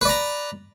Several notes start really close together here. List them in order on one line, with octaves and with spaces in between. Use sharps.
B4 D5 A#5